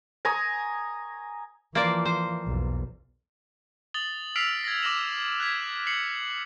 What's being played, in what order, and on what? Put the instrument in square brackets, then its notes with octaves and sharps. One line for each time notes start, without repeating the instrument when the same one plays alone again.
[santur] G#5 A#5 C#6 D#6
[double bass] E3 F3 [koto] A#3 C5 D5
[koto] C5
[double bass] B1 E2
[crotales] D#6 A6 F#7 G7
E6 F6 B6 C7 D7 F7
G#6 A#6
D6 F6 A#6 E7 F#7
F#6 G#6 B6
C7 C#7 F#7